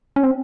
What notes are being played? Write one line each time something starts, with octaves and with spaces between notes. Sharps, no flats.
C#4
C4